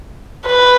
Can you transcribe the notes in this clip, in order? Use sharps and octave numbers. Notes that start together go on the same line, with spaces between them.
B4